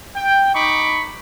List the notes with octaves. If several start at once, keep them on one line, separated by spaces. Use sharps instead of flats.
G5
D#4 B5 C#6 D6